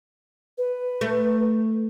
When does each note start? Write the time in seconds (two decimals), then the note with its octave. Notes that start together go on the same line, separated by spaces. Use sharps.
0.58 B4
1.01 A3